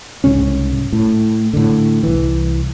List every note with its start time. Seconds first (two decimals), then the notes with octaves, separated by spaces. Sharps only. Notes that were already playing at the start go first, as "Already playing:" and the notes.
0.24 C2 G#2 C#3 C#4
0.93 A2
1.53 A2 D3
2.03 C2 E3